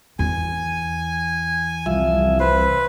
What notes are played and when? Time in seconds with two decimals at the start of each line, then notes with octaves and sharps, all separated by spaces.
0.19 E2 G#5
1.86 C2 F3 E5
2.40 B4 C5